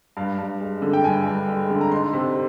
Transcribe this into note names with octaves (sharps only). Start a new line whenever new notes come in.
G2 F5
G2
G#3
D3
G5
G2 G#5
G2
G#3
D3
A#5
D#4 C6
C3